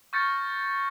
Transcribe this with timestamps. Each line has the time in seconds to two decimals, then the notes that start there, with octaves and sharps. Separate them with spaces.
0.13 C#6 F6 G6 A6 A#6 C#7